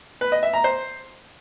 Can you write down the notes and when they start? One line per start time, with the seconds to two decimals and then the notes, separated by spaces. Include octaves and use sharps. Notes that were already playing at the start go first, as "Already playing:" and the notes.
0.21 B4
0.32 D#5
0.43 E5
0.54 A#5
0.64 C5